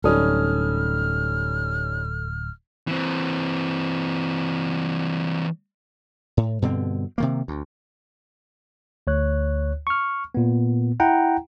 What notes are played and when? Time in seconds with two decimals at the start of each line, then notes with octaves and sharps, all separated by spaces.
0.04 D1 G3 C#4 D#4 A4 D#6 F6
2.88 E3 C4
6.37 A2
6.62 G2 B2 D3 C4
7.18 C3 D#3 A#3
7.48 D2
9.07 D2 C#5 F#6
9.87 C#6 F6
10.35 A#2 B3
11.00 E4 F#5 G5 A#5